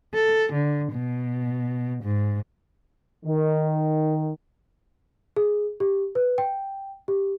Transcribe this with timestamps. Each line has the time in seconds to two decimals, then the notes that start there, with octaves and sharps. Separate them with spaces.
0.14 A4
0.53 D3
0.93 B2
2.03 G#2
3.25 D#3
5.36 G#4
5.80 G4
6.15 B4
6.38 G5
7.08 G4